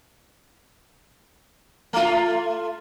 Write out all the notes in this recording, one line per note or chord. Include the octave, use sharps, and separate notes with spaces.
A3 F4